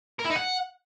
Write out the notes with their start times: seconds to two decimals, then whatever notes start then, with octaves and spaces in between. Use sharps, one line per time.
0.19 A#4
0.24 E4
0.30 D#4
0.35 F#5